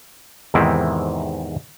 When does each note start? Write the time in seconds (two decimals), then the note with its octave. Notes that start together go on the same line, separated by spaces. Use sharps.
0.54 E2 G#2 C3 D#3 C4 E4